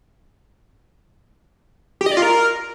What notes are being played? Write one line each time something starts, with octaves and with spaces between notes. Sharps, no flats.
G4
D#5
D5
F4
A#4